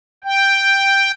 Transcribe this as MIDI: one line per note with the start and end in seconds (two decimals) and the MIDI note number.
0.24 1.11 79